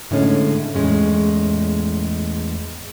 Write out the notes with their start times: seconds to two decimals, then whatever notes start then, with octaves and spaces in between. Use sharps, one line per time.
0.11 A2 D3 G#3 C#4 A4
0.75 E2 A2 G#3 C#4